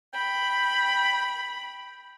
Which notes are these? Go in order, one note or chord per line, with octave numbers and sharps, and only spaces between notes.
G5 B5